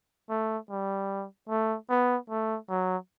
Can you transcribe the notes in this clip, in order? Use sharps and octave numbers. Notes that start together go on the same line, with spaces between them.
A3
G3
A3
B3
A3
F#3